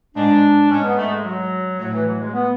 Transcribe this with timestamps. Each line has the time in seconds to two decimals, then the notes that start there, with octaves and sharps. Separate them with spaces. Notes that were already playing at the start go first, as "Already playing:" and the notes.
0.15 G#2 D4
0.69 G#2 C#4
0.83 B3
0.97 A3
1.10 G#3
1.23 F#3
1.78 A2 F#3
1.92 E3
2.05 F#3
2.19 G#3
2.33 B3